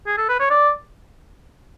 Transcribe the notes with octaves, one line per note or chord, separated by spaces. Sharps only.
G#4
A4
B4
C#5
D5